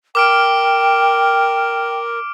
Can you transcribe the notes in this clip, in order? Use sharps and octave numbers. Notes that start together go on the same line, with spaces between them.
A#4 G5 D6 F6 D7